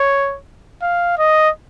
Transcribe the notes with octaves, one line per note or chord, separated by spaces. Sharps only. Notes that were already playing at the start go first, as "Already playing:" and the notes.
Already playing: C#5
F5
D#5